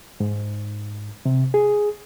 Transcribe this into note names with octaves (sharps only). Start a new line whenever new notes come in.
G#2
C3
G#4